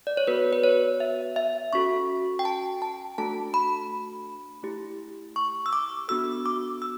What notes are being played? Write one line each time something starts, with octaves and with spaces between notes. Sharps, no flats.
D5
C#5
B3 F#4 A4 B4
B4
C#5
E5
E5
C#4 F#4 A4 C#6
G5
A5
A5
A3 D4 F#4 A4 A5
B5
A3 E4 G4
C#6
E6
D6
B3 D4 F#4 A4 E6
D6
E6